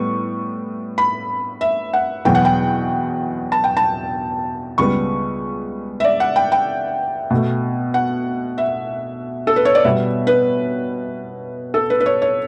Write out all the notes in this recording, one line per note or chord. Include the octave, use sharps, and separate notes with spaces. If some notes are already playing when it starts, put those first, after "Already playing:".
Already playing: A2 G3 B3 C#6
B5
E5
F#5
E2 B2 F#3 B3 G5
F#5
G5
A5
G5
A5
C#2 C#3 G3 B3 C#6
E5
D5
F#5
G5
G5
B2 A3
F#5
E5
A4
B4
C#5
D5
B2 G3 B3 E5
B4
A4
B4
B4
C#5
C#5